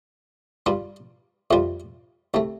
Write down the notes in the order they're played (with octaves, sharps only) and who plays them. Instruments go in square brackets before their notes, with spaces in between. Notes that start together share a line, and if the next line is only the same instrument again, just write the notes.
[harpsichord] G2 G3 F4
F2 C3 G3 F4
C2 C3 A3